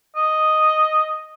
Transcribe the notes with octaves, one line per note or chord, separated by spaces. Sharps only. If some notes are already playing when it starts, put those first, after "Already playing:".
D#5